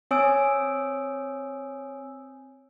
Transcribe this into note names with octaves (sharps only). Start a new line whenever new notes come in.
C4 C#5 G#5 D#6 E6 D7